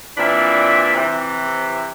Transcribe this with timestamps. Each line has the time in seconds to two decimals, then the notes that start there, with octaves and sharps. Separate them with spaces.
0.18 A#2 E3 C4 D4 E4 B5
0.95 C3 E3